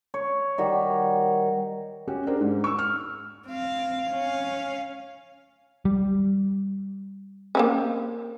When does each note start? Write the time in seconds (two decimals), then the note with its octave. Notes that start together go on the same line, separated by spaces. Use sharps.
0.14 C#5
0.58 D#3 G3 F#4
2.08 C#4 F#4 G4
2.27 D4 G#4 A#4 C5
2.41 G#2
2.64 C#6 E6
2.79 F6
3.47 C4 F5
4.11 C#4 F5
5.85 G3
7.55 A#3 C4 C#4